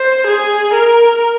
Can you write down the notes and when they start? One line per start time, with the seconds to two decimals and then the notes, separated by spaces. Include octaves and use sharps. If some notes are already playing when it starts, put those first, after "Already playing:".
Already playing: C5
0.27 G#4
0.73 A#4